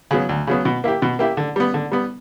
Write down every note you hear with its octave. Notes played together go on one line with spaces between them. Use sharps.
C#3 F#3 B3
D2
C#3 F#3 B3
B2
A#3 E4 G4
B2
A#3 E4 G4
D3
G3 B3
D3
G3 B3